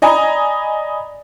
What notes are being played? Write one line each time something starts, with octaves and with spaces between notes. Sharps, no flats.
D5 D#5 G#5 A#5 B5